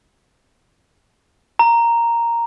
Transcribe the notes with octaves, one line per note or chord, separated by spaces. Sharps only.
A#5